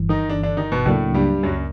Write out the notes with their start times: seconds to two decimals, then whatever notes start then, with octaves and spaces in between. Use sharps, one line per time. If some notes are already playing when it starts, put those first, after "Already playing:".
Already playing: G1 G2 E3
0.09 D#3 D#4
0.29 D3 D4
0.43 D3 D4
0.57 D#3 D#4
0.72 B2 B3
0.86 C#2 A2 C#3 F#3 A3 A#3 D4
1.14 G2 G3
1.43 F#2 F#3